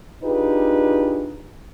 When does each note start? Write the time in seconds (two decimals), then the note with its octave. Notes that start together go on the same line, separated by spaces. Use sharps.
0.24 D4 D#4 F4 G4 G#4 B4